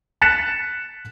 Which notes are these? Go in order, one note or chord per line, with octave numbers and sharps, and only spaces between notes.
F#6 A6 B6 C#7 E7